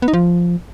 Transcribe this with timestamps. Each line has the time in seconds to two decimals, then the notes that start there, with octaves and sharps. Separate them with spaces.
0.02 B3
0.08 D#4
0.13 F3